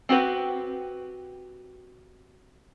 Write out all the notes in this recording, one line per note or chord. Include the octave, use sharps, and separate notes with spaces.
C4 F#4 G4 B4